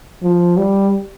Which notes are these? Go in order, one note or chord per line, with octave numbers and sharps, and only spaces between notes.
F3
G3